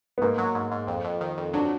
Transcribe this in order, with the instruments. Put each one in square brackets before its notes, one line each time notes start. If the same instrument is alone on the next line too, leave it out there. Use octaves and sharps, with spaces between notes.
[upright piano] B3
[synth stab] G#2 [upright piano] A#3
[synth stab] F#3
G#2
G#2
F2
F2
D#3
F2
[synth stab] F#3 [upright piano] D4